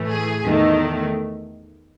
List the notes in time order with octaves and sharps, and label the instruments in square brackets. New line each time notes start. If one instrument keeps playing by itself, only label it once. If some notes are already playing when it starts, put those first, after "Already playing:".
Already playing: [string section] A2 E3 A3
G#4
E2 D#3 A3